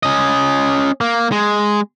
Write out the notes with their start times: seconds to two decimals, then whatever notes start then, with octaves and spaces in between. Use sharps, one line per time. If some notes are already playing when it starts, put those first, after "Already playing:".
0.03 C#4 D#5
1.01 A#3
1.32 G#3